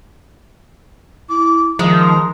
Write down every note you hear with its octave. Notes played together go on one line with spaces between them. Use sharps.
E4 D6
D#3 F3 G#3 A#5